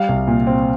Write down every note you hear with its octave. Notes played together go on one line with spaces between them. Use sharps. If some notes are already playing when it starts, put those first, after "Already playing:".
Already playing: G3 F5
C2
A#2
C4